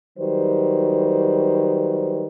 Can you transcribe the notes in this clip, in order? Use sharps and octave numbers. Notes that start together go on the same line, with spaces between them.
D#3 F#3 G3 B4 C5